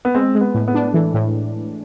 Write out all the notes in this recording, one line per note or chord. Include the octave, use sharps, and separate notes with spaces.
B3
G#3 C4
G#3
B3
A2
B3
D4
E3 A3
A2